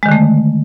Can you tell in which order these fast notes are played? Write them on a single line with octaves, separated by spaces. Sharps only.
G#3 D#3 D3 A3